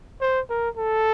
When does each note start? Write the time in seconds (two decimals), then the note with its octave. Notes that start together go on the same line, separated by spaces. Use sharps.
0.21 C5
0.50 A#4
0.77 A4